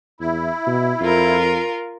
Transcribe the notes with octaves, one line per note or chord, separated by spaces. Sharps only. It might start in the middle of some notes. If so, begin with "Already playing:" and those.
E2 E4
B2
F2 F4 A#4